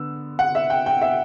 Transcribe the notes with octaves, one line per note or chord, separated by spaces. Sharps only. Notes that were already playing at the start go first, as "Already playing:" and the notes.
Already playing: D3 B3 E6
F#5
E5
G5
G5
E5